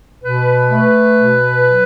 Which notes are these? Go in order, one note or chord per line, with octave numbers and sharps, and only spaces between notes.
B2 B4
A3
B2
F#3